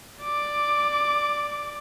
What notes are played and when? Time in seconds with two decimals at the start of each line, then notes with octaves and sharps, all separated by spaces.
0.24 D5 D6